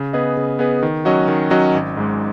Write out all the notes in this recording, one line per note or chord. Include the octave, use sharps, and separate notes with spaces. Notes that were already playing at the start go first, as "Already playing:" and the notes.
Already playing: C#3
B3 G#4 B4 D#5
C#3
B3 G#4 B4 D#5
D#3
F#3 C#4 F#4 D#5
D#3
F#3 C#4 F#4 D#5
G#1
G#2 G#3